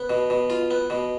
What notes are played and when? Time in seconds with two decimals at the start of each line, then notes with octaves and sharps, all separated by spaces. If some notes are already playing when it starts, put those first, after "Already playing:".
Already playing: B3
0.10 B2
0.30 B2
0.50 F4
0.71 B3
0.90 B2